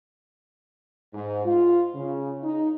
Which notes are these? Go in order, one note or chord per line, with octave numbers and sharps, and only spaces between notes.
G#2
F4
C#3
D#4